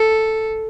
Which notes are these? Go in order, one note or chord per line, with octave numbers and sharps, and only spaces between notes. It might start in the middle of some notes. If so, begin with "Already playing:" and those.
Already playing: A4